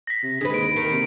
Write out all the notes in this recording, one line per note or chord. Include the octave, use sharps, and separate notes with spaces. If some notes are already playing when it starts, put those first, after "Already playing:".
A#6 B6
C3
D3 G#3 B4
D#2 D7
D#3
C3